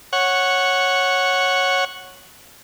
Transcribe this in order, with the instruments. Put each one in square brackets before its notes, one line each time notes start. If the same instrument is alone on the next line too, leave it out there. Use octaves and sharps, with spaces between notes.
[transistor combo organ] C#5 F#5